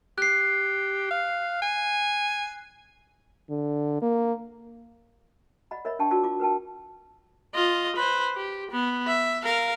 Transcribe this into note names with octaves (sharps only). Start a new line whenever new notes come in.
G4 F#6 C7
F5
G#5
D3
A#3
D5 D#5 F#5 B5
A#4 C#5 D#5 E5 B5
D4 G5 A5 C#6
F4 F#4 D5 A5 E6
F4 D6
A#4 B4 G5 A5
F4 D#5
B4 C5
G4
B3
E5
A#4 F5